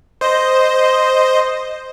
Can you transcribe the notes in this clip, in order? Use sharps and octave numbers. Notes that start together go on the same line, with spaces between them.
C5 D#5